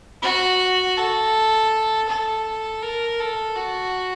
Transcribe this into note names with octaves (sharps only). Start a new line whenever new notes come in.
F#4
A4
A4
A#4
A4
F#4